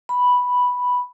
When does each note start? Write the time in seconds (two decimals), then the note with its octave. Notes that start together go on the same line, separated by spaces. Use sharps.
0.09 B5